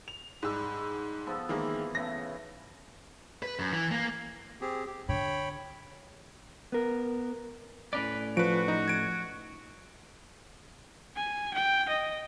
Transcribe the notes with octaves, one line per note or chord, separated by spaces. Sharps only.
F7
G#2 G3 E6
F3 B3 A4
D#3 E3 G#3 A#3
C#3 A3 B3 A#6
B4
F#2
E3
A#3
C4 G4 G#4
G4
D3 C#5 G5 B5
B3 A#4
A2 C#4 B4 D5
F3 F#4 B4 D7
D#4
G#6 D7
G#5
G5
D#5